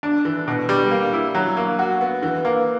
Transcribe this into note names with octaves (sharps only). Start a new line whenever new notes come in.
D4
E3
B2
G3
A#3
E4
F#3
A#3
F#4
B3
E3
A#3